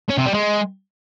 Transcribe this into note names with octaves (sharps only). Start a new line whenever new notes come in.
C#4
C3
G3
G#3